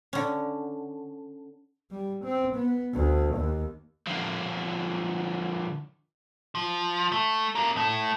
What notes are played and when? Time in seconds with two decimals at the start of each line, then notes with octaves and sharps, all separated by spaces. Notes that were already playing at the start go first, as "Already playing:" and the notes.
0.13 D3 C#4
1.91 G3
2.24 C4
2.56 B3
2.94 D2
3.35 D#2
4.07 D3 F3
6.55 F3
7.12 A3
7.55 D4 A#4
7.76 A2 A3